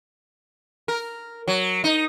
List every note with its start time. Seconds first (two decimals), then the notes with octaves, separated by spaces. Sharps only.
0.88 A#4
1.48 F#3
1.84 D#4